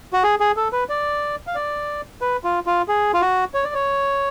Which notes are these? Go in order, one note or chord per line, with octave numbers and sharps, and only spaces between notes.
F#4
G#4
G#4
A4
B4
D5
F5
D5
B4
F4
F4
G#4
F4
F#4
C#5
D5
C#5